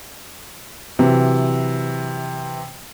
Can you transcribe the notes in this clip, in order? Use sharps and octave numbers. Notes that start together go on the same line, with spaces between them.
C3 E3 F#3